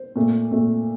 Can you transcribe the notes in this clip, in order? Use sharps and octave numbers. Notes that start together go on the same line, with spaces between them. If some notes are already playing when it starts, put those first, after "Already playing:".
Already playing: C5
A#2 A3
A#2 A3